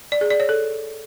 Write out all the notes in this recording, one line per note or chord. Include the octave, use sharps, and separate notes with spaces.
D5
G#4
D5
C#5
A4